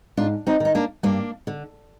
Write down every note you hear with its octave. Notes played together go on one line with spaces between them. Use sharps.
G#2 D4 F4
C4 D#4
D#3 D#4
A#3 D4
G2 A#3 D4
D3